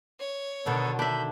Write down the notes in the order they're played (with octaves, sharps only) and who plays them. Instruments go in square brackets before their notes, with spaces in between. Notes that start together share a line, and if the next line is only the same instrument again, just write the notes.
[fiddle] C#5
[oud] B2 D3 D#3 [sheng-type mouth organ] B3 A4
[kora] D4 E5 [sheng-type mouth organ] B5 G6